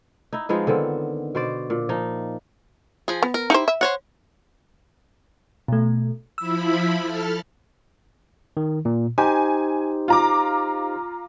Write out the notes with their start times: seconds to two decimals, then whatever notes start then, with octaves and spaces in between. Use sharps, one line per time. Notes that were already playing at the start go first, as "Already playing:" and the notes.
0.33 D#4 E4
0.49 F3 G#3 B3 D#4
0.67 D3 D#3 B3 C4
1.35 B2 C5 D5
1.70 A#2
1.89 F3 D#4
3.08 F3 G#4
3.23 B3
3.34 A#4
3.50 D#4 E4 G4 C5
3.68 E5
3.81 C5 C#5 F#5
5.68 B2 A3
6.38 F3 E4 B5 E6
7.01 A4 A5 F6
8.57 D#3
8.85 A#2
9.18 D#4 G4 C5 G#5
10.08 F4 A#5 D6